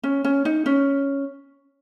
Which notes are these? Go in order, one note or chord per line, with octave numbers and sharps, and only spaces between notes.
C#4
C#4
D#4
C#4